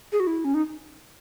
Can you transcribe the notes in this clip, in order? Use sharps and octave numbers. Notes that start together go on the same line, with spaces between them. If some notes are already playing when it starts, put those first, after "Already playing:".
G#4
F#4
E4
C#4
D#4